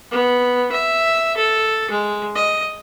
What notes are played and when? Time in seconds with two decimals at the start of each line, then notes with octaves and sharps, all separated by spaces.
0.11 B3
0.72 E5
1.36 A4
1.90 G#3
2.35 D#5